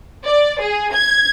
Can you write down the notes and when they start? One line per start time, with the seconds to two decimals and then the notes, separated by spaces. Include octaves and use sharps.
0.25 D5
0.61 G#4
0.94 G#6